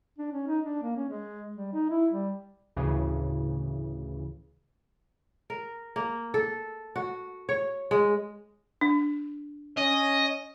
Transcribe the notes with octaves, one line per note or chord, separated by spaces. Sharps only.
D4
C#4
D#4
D4
A#3
C#4
G#3
G3
D#4
E4
G3
D2 A2 C#3 E3
A#4
A#3
A4
F#4
C#5
G#3
D4
C#4 D#5